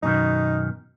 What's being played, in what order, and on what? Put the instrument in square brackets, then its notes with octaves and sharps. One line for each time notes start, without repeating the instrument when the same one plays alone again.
[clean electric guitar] F#2 B2 D#3 [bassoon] D#4